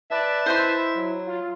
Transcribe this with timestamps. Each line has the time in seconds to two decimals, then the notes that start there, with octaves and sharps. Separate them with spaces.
0.11 B4 D5 E5 A5
0.46 E4 C5 D#5 C6
0.64 E4
0.96 F#3
1.27 F4